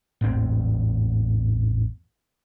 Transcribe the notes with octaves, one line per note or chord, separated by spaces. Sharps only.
A1 E2 G#2 C4